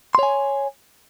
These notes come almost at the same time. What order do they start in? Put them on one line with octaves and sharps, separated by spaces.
C6 C#5 G#5